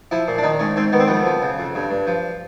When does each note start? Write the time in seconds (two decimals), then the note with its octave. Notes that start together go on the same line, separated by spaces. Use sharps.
0.11 F3 E4
0.28 A#2
0.38 D4
0.43 D#3 D#4
0.59 G#2 C#4
0.76 G#2 C4
0.92 D#3 B3
1.00 C4
1.07 F2 B3
1.26 F3
1.42 C#3
1.59 F2
1.75 G2
1.91 G2
2.07 F3